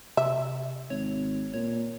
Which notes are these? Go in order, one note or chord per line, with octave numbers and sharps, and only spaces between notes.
C3 E5
G#1 C#5
A#2 C#5